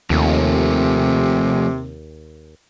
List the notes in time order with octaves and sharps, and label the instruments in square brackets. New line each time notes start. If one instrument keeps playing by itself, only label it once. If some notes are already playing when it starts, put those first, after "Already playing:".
[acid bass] D#2 [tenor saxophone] C3 [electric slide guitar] F3 A3